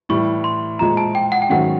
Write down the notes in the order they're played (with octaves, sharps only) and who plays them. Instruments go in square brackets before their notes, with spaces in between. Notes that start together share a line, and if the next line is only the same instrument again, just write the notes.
[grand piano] A2 E3 G3 [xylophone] C#6
[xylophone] C6
[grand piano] A#2 F3 G#3 [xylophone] A#5
[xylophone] A5
G5
F#5
G5
[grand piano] G#2 D#3 F#3 A3 C#4 [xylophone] F#5